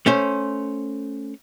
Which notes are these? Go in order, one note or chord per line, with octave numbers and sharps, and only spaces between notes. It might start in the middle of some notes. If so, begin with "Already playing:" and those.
A3 C#4 C5